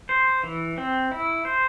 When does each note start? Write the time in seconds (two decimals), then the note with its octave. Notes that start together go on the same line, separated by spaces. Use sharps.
0.09 C5
0.43 E3
0.78 C4
1.11 E4
1.45 C5